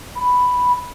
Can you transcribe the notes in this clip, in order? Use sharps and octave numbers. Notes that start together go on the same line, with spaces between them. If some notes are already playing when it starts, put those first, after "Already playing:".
B5